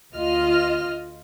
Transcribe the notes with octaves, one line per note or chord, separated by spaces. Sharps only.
D2 F4 D#5 F6